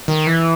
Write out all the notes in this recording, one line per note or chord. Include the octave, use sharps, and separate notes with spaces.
D#3
E3